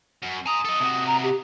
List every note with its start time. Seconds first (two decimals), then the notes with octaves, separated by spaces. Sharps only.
0.22 F#2
0.46 G#5 A#5 D#6
0.65 A4 D#5
0.80 C3 F#4
1.06 A#5
1.22 G4